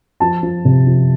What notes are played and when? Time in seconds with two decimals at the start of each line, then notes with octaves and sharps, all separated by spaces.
0.20 F3 A5
0.43 F3
0.65 C3
0.87 F3